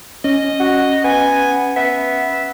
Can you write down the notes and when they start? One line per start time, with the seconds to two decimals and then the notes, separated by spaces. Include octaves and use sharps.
0.24 C#4 D#5
0.60 F#4
1.04 B3 G#5
1.76 B3 E5